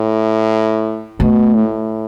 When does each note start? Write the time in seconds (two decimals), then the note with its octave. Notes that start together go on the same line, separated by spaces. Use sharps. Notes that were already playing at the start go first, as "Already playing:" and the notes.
Already playing: A2
1.20 B2 A3
1.55 A2